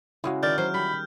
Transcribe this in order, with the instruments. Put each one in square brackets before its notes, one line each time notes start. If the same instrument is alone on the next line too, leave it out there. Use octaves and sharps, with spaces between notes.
[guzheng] C#3 G#3 F5 [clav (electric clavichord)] E4 F#4
[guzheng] D#3 [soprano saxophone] D5 [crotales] F6 G6
[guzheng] F#3 [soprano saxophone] C5
[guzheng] G3 [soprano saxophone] B5